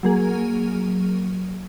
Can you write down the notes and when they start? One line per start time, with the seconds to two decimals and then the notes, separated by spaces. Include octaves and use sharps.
0.03 F#3 A#3 G#4